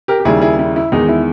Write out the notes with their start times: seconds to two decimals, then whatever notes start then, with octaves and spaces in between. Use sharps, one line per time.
0.08 G4 A#4
0.20 G4
0.25 D#2 C#3 G3 E4 G#4
0.41 E4 G#4
0.59 E4
0.76 E4
0.92 E2 D#3 G#3 D#4
1.09 E4